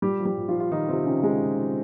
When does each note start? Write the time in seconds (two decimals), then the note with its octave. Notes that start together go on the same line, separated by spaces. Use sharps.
0.02 A#2 G3 G4
0.20 F3
0.25 G3 G4
0.38 A#2
0.48 F3 F4
0.55 A#2
0.60 F4
0.72 D#3 F3 D#4
0.89 C3 F3 C4
1.06 C#3 F3 C#4
1.23 F3 G#3
1.42 A#2
1.58 F3